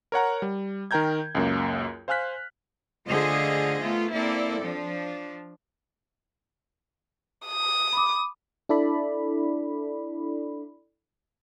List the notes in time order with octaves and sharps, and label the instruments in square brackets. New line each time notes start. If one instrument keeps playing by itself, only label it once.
[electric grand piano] A#4 C#5 F#5 A#5
G3
D#3 A#4 G5 A#5 G6 G#6
C#2 F#2 A#3
C5 F5 G#5 F6 F#6 B6
[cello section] D3 A3 F4 G#4 C5 D#5
A3 B3 F4
A#3 C4 E4 A4 D5
F3 D4
[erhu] D#6
[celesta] B5 D6
[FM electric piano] D4 E4 A4 D5 B5